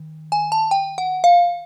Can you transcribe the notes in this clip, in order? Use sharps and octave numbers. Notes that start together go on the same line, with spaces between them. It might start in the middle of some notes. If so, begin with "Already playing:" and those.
Already playing: D#3
G#5
A5
G5
F#5
F5